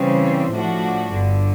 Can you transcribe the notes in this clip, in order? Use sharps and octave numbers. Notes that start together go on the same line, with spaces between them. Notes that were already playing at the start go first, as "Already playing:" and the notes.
Already playing: C#3 E3 G3 C4
A2 F3 A3 D4 F#4
G1 G2 D3